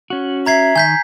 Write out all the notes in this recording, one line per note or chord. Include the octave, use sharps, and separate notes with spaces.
C#4 F#4
E5 A#5 G#6 C7
D#3 G#5 G6 B6